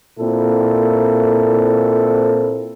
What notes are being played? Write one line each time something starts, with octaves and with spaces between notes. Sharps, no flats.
A#2 A#3 C4 E4 A4